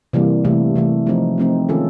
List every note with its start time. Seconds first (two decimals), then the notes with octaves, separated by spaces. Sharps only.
0.13 C3 E3 G3 A#3
0.45 C3 E3 A3
0.76 C3 E3 A3
1.06 F3 A3 C4 D#4
1.38 F3 A3 C4 D#4
1.69 D#3 G#3 C#4 F4 A4